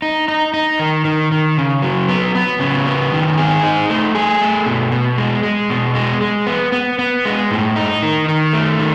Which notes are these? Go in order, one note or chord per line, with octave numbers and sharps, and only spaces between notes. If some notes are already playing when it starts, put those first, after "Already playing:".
D#4
D#4
D#4
D#3
D#3
D#3
C#3
F#3
B3
B3
C#3
B3
D#3
G#4
D#4
A3
G#4
A3
B2
B2
G#3
G#3
B2
G#3
G#3
B3
B3
B3
G#3
A2
D#4
D#3
D#3
A3
D#3